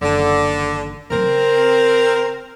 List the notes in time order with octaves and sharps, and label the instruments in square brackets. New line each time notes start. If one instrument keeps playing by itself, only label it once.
[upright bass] F#1 D#3 [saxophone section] D3
[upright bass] A#2 F#3 [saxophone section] C4 A#4
[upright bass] C#3